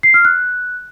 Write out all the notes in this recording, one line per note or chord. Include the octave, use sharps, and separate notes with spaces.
C7
F6
F#6